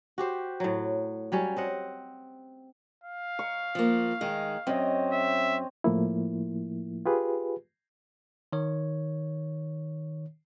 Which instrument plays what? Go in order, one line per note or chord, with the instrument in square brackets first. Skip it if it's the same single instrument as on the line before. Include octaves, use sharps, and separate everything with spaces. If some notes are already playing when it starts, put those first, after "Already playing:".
[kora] F#4 G4 C5
A2 F#3
F#3 G3 C#4
C4 D#5 F#5
[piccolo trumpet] F5
[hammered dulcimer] C#6
[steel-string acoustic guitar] F3 A#3
D#3 G#3
[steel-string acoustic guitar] F#2 [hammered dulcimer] C4 C#5 D#5
[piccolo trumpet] E5
[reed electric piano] A2 F3 A#3 E4
F4 G4 G#4 B4
[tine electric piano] D#3 C#5